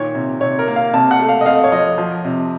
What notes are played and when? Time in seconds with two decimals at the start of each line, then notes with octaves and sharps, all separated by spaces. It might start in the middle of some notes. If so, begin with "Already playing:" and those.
Already playing: A#2 D#3 C#5
0.15 C3
0.41 C3 C#5
0.59 A#4
0.68 A#3
0.76 F5
0.93 C3 A5
1.11 F#5
1.19 A3
1.29 F5
1.41 D#5
1.46 F2 F5
1.64 C#5
1.72 F3 D#5
1.98 F3
2.25 C3